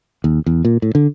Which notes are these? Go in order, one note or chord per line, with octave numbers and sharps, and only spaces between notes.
D#2
E2
A#2
A2
D3